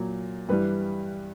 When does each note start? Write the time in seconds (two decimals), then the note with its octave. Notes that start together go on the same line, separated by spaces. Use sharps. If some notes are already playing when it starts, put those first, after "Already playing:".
Already playing: A#2 F#3
0.49 G2 E3 G3 B4